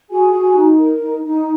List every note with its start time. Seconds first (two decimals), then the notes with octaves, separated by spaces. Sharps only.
0.09 F#4 G#4 G#5
0.32 F#4
0.55 D#4
0.77 A#4
1.00 D#4
1.24 D#4